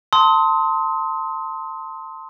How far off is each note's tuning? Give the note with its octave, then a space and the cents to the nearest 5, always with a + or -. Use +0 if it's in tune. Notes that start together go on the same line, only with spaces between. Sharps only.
A5 +30 C6 +0 D#6 +35